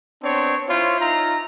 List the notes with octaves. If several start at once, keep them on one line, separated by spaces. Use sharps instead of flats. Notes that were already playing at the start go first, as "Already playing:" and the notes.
B3 C4 D4 C#5
E4 F4 C5 C#5
D#4 F4 E5 A#5